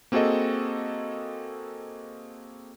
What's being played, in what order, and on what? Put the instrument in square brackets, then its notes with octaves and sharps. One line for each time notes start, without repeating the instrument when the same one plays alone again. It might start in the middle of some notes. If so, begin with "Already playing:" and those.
[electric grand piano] A#3 C4 F#4 G#4 A4 D#5